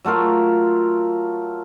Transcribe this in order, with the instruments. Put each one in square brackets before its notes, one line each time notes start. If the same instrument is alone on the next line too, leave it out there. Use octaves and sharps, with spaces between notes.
[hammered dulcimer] F#3 A3 F4 A#4